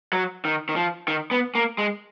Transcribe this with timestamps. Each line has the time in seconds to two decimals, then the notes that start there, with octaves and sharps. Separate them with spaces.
0.13 F#3
0.45 D#3
0.69 D#3
0.76 F3
1.08 D#3
1.31 B3
1.55 A#3
1.78 G#3